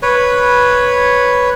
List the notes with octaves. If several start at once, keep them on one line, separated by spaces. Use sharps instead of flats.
B4 C#5